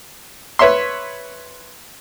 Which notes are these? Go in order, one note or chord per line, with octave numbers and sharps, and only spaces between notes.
B4 C#5 E5 C6